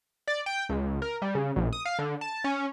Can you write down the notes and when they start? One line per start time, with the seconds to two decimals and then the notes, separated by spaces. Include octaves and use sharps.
0.27 D5
0.46 G5
0.69 C#2
1.02 A#4
1.22 G3
1.35 C#3
1.56 A#1
1.73 D#6
1.85 F5
1.99 D3
2.21 A5
2.44 C#4